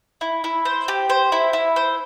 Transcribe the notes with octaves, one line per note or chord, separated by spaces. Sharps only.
E4
E4
C5
G4
C5
E4
E4
C5